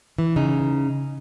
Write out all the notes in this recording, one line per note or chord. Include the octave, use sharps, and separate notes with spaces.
E3
C#3 D#4